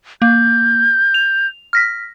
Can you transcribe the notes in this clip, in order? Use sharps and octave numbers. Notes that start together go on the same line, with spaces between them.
A#3 G6
F7
F6 A#6 B6